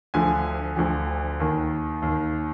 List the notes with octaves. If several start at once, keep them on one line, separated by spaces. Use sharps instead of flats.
D2 D3 F3 G#5
D2 D3 F3
D#2 D#3
D#2
D#3